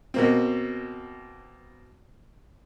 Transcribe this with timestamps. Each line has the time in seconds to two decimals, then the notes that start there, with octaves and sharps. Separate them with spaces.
0.14 B2 A#3 C4